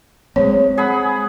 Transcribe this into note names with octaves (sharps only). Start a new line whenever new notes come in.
G#3 A3 C4 C#5
G#4 F#5 B5